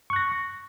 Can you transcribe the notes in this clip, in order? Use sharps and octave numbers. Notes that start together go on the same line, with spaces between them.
C#6 F#6 A#6